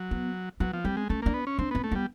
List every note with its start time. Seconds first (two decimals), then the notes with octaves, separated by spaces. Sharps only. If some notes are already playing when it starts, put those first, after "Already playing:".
Already playing: F#3
0.11 B3
0.60 F#3 B3
0.73 F3
0.85 G3 C4
0.97 G#3
1.10 A3 C#4
1.22 A#3 D4
1.34 B3
1.47 C#4
1.59 C4 D4
1.71 B3 C4
1.84 A3
1.92 G3 B3